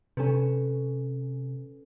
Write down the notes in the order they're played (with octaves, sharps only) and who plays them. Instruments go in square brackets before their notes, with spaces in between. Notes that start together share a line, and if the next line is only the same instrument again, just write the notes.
[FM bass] C3 [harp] C#4 A4 B4